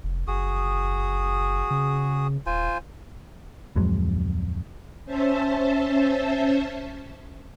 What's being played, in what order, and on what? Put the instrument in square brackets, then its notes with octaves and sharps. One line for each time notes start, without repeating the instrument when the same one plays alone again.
[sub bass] F1
[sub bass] F#1 [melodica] F#4 G#4 D#6
[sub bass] C#3
[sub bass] D#1 [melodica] F4 C5 G#5
[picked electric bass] D1 F2 F#3 G#3
[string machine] C#4 C5 E5 A5